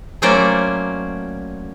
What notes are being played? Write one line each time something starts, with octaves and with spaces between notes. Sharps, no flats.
F#3 A3 A#3 C#4 C5 D5